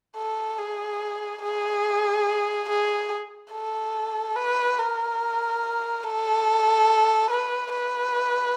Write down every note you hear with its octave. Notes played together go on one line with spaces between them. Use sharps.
A4
G#4
G#4
G#4
A4
B4
A#4
A4
B4
B4